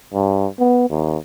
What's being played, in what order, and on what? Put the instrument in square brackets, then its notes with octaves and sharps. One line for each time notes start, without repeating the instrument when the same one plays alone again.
[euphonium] G2
B3
D#2